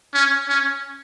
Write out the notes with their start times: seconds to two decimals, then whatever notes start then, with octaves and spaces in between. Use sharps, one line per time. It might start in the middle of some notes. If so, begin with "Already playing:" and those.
0.14 C#4
0.48 C#4